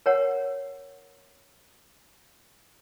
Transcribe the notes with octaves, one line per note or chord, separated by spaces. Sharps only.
A#4 C#5 F#5